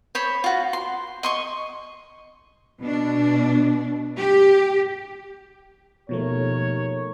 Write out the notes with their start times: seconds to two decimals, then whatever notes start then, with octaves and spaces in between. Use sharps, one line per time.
0.15 C5 C#5 B5
0.44 F4 F#4
0.73 C6
1.23 D#5 C6 C#6
2.81 B2 D4
4.18 G4
6.09 D#2 B2 F3 A3 A#4 C#5